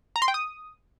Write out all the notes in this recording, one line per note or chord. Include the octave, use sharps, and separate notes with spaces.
A#5
C6
G5
D#6